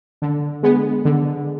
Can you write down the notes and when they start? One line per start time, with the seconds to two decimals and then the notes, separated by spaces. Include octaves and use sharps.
0.22 D3
0.63 G#3 B3
1.05 D3